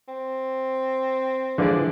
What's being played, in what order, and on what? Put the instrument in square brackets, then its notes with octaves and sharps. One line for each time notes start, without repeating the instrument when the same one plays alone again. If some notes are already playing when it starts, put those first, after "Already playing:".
[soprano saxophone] C4
[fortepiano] D3 G#3 D5 [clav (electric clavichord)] E3 F3